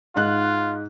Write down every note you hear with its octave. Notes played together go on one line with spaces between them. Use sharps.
G#2 D#4 F4 F#6